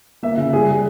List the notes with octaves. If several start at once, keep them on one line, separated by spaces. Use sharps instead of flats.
A#3 E5
C#3
G3 G#4
G3